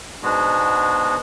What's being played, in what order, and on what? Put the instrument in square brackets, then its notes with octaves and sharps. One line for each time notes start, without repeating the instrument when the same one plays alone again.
[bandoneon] G#2 B2 G#3 B3 D4 F#4